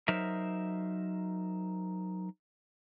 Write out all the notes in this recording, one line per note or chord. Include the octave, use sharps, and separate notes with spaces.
F#3 D#4 A#4 C5 E5